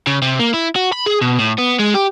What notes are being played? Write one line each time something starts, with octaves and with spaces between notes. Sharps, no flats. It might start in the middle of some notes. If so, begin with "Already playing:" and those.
C#3
C3
A#3
E4
F#4
B5
G#4
B2
A2
B3
G#3
G4